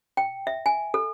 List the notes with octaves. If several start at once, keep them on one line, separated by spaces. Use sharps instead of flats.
G5
E5
G#5
A4